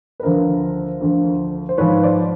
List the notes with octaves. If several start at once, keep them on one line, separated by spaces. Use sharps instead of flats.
B4
D2 D3 F3 A#4 C5
D2 D3 F3
C5
G#2 F3 B4 C#5
C5 D5